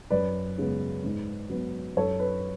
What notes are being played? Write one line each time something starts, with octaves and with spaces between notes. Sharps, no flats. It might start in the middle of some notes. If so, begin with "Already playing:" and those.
F#2 B4 D5
C#3 G#3 B3
G#2
F#3 B3
F#2 A4 C#5
B4